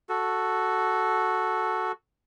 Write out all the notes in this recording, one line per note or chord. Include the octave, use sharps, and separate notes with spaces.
F#4 A4